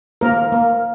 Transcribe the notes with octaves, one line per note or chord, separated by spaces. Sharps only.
A#3 A#4
A#3